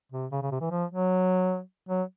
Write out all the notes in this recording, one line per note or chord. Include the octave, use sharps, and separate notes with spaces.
C3
C#3
C#3
C3
E3
F3
F#3
F#3